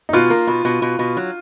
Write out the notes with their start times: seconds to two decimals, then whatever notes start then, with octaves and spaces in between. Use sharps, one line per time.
0.09 D#4
0.13 B2 F4
0.30 A#3
0.47 B2
0.65 B2
0.82 B2
0.99 B2
1.17 F#3